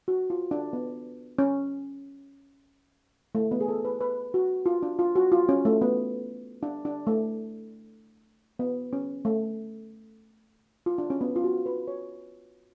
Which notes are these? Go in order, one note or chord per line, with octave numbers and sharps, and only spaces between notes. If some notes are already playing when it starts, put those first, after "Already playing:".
F#4
F4
D4
B3
C#4
A3
B3
G#4
A4
B4
B4
F#4
F4
D4
F4
F#4
F4
C#4
A3
B3
D4
D4
A3
B3
C#4
A3
F4
D4
C#4
B3
F4
F#4
B4
C#5